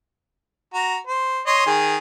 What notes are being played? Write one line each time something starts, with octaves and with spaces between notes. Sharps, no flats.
F#4 A#5
C5
C#5 D#5 C6
D#3 G#4